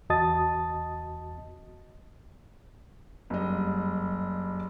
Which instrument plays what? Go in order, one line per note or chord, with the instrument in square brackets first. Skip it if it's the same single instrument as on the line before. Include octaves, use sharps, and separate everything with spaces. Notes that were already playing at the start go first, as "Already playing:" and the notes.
[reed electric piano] E2 F#4 D#5 A5 D#6 A6
[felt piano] F#1 G2 D#5